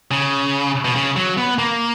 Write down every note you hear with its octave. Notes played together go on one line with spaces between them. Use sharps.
C#3
B2
C#3
F#3
B3
A#3